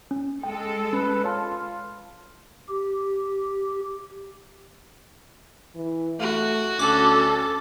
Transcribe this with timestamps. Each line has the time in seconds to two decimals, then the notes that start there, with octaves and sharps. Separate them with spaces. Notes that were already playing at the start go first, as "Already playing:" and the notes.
0.11 C#4
0.43 G#3 A4 G5
0.93 C#4 B4
1.24 F4 C#5 A5
2.69 G4
5.75 E3
6.20 A3 F#4
6.79 D2 C#4 A4 D6